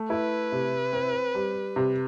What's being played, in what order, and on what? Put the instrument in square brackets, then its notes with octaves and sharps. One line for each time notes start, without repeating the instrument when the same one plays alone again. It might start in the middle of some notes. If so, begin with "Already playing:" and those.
Already playing: [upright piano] A3
[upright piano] E4 [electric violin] B4
[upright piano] C3
C4
G3
C3